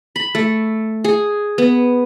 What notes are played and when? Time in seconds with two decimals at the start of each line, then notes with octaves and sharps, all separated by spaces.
0.16 B5
0.35 A3
1.04 G#4
1.58 B3